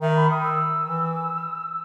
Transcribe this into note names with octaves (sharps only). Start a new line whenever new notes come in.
D#3 E5
B5
D#6
E6
E3